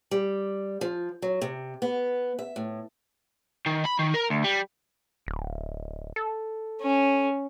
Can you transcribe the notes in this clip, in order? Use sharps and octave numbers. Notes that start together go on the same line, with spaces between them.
G3
F3
F#3
C3
B3
E5
A2
D#3
B5
D#3
A#4
D2
G3
D1
A4
C#4